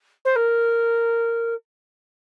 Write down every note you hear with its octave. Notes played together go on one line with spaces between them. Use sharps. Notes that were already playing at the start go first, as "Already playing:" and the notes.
C5
A#4